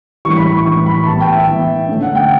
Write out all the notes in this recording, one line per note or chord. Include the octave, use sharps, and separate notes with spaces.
A2 E3 G3 C#6
B5
C#6
A2 E3 G3 C#6
B5
E3 B3 A5
G5
E5
E3 B3
D3 A3 C#4
F#5
G5